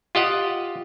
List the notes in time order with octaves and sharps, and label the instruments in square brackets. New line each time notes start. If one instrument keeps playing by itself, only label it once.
[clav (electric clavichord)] F4 G4 D#5 F#5